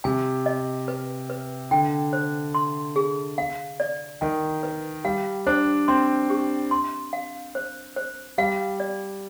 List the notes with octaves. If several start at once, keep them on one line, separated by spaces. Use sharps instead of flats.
C3 G#5
D#5
B4
B4
D3 G5
C5
C6
G#4
F5
D5
D#3 G#5
B4
G3 F5
D4 C5
C4 C6
G4
C6
F5
C5
C5
G3 F5
D5